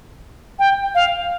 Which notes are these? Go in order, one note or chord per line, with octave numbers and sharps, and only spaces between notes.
G5
F5